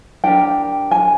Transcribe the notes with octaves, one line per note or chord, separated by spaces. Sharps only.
D4 G4 A#4 G5
G#5